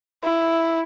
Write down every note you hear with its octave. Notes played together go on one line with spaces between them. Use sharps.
E4